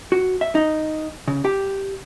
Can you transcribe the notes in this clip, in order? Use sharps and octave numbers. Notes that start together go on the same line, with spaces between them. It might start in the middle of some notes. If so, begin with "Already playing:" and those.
F#4
E5
D#4
C#3
G4